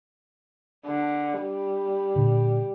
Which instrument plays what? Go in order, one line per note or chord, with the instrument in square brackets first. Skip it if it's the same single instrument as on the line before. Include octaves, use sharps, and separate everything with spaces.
[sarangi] D3
G3
[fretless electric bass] A#2 D3